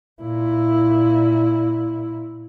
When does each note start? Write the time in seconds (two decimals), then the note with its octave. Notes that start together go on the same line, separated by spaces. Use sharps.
0.22 A#2 E4